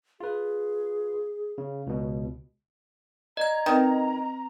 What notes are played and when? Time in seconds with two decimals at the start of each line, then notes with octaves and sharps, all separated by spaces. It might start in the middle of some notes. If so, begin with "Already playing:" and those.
0.20 F4 G#4 B4
1.58 C#3
1.87 C#2 B2
3.37 D5 D#5 A#5 G#6
3.66 D#3 C4 B4 D5